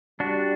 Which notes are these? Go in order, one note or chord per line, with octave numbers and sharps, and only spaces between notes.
G3 D4 F#4